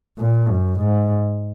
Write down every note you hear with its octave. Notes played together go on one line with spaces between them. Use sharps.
A#2
F#2
G#2